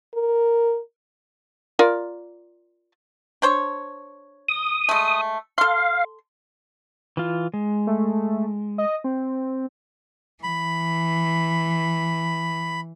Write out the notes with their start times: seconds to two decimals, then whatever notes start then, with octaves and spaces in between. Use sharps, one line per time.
0.14 A#4
1.79 F4 A#4 D5
3.42 D4 C5 C#5
4.48 D#6
4.89 G#3 A3
5.58 A4 F5 C6
7.17 E3 F4
7.54 G#3
7.87 A3
8.78 D#5
9.04 C4
10.43 E3 B5